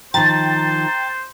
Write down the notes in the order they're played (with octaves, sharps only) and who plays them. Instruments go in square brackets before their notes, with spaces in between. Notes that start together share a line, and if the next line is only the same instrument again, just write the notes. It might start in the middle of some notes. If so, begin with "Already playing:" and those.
[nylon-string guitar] D#3 F3 [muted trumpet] C5 [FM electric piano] G5 A#5 [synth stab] A6